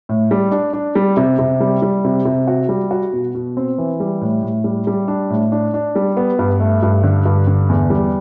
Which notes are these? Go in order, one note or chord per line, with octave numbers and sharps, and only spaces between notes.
A2
G3
D4
D4
G3
C3
C3
G3
G3
C3
C3
F#4
G3
F#4
B2
B2
C4
E3
G3
A2
A2
G3
G3
D4
A2
D4
D4
G3
B3
G2
A3
G2
D3
G2
D3
E2
G3